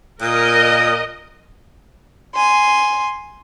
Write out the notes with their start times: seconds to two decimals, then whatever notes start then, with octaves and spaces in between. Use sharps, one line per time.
0.21 A#2 A#4 D#5
2.35 G#5 C6